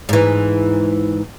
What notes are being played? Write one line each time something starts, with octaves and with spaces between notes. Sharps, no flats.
G#2 E3